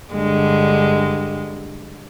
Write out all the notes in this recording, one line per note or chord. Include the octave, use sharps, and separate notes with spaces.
G2 D3 G#3